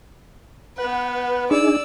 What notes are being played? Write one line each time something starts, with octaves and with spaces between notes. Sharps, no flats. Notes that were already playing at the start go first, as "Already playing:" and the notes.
B3 B4 F#5
D4 D#4 G#4 D5 E6